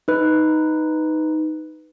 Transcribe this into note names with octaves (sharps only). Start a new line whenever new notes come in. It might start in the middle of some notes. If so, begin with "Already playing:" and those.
D#4 B4